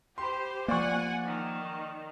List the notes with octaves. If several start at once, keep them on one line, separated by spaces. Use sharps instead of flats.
G4 C5 B5 C6
F3 A#3 D5 F#5 G#5 C#6
D#3